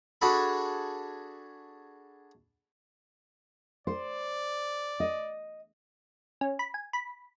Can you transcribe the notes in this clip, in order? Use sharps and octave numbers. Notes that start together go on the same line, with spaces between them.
D4 F#4 G#4 A4 B5
C5 D5
D#5
C#4
B5
G#5
B5